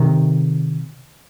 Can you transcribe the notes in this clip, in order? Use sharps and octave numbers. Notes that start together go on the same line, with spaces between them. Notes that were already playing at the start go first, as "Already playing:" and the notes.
Already playing: C3 D#3